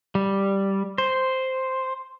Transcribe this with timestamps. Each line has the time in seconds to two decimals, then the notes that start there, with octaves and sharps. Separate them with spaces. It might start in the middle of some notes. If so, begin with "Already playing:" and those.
0.15 G3
0.98 C5